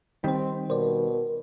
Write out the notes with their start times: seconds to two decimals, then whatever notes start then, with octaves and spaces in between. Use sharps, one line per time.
0.24 D#3 G3 C4 D#4 C5
0.70 B2 A#4 C5 D5